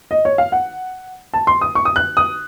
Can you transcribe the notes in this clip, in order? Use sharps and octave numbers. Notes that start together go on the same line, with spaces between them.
D#5
C#5
F5
F#5
A5
C6
D#6
C#6
D#6
F#6
D#6